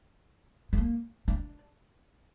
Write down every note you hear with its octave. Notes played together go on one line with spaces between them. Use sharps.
A3
A#3
D4